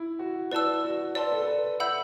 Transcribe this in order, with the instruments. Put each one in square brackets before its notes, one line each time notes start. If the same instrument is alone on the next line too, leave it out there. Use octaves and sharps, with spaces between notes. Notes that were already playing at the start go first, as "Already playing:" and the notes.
Already playing: [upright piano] E4
F#4
[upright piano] E4 [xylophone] B4 D5 A5 E6
[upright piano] F#4
[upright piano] B4 [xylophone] D5 A5 C6 E6
[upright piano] A4
A4
B4
[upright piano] E5 [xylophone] F#5 B5 E6 G6